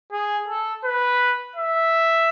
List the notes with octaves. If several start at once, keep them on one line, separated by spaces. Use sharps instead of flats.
G#4
A4
B4
E5